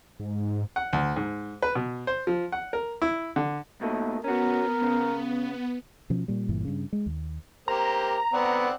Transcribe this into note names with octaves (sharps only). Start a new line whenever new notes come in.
G#2
F#5
D2
G#2
B4
B2
C5
F3
F#5
A#4
E4
D3
B2 A3 A#3 D#4
B3 C#4 F#4 A#4
C#3
B2 F3 C#4
A#2 G3
G1 G2 A#2 E3
G2 C#3
G#3
D#2
A#3 G4 C5 A#5
B3 C4 D5 F#5